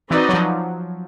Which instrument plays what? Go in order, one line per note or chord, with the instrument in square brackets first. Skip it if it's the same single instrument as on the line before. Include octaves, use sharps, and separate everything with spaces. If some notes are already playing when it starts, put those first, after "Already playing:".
[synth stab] E3 [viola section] C4 D#4 F#4 B4 D5
[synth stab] F#3
F3